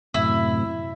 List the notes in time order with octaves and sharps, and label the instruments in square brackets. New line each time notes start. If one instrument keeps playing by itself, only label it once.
[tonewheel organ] F#2 A2 C3 [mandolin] E4